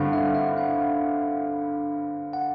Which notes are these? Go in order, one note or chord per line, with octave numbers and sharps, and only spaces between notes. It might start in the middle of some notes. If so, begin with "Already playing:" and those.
Already playing: G2 D3 G3 C4 F5 F#5
E5
E5
F5
F#5